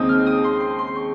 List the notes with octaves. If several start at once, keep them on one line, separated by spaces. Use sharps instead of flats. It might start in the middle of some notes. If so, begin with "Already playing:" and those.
Already playing: D#2 C#3 G#3 C4 D#4 D#6
F6
D#6
C6
C6
C6
C#6